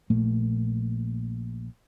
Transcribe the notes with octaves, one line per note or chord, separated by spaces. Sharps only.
A#1 A#2 A3 A#3